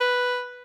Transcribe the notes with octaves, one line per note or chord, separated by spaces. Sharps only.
B4